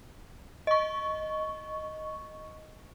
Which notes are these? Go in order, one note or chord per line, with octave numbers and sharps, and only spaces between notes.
D#5 C#6